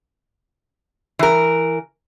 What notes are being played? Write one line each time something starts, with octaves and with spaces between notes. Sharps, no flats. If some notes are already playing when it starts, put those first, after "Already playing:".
E3 A#4